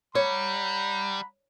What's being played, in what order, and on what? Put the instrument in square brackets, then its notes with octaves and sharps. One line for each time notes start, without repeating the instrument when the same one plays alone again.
[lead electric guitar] G3 [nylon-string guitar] C#5 [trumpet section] F#5 A#5 B5